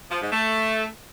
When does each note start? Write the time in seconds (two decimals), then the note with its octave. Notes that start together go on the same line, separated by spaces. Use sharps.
0.11 F3
0.22 G#2
0.33 A3